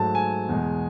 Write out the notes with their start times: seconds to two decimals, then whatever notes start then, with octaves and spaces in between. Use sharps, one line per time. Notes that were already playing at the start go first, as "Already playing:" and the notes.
Already playing: G#2 F#3 A3 A5
0.15 G#5
0.49 E2 B2 G#3